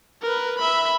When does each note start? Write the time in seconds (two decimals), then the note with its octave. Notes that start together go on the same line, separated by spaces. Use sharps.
0.22 A#4 B4
0.59 E5 B5